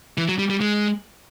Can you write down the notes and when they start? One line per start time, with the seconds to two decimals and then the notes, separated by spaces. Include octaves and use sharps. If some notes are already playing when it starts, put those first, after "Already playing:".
0.18 E3
0.29 F#3
0.39 G3
0.50 G3
0.61 G#3